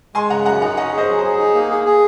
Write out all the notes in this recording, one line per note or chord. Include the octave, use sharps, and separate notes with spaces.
G#3 G#5 C6
C#3 F#5 A#5
F#2 F#5 A#5
D#4 F#5 A#5
C#4 D#5 F#5
G#4
C5 D#5
F#3
C5
G#4
D#4
A#3
G#4
G#4